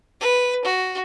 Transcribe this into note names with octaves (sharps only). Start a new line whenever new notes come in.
B4
F#4